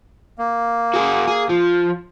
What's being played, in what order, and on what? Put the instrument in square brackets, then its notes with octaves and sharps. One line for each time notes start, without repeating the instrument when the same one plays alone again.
[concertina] A#3
[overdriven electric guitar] F#4 G#4
G#4
F3